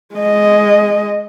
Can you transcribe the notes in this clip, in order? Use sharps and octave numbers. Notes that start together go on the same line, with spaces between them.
G#3 D#5